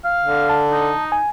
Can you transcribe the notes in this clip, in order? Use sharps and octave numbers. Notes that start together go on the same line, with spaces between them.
F5
D3
A5
D#4
G#5